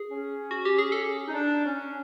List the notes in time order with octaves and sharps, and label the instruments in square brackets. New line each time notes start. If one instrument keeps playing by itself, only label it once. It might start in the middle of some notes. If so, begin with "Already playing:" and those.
Already playing: [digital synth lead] G#4
[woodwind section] C#4
[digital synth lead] F#4
G4
G#4
A4
[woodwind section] D#4
D4
C#4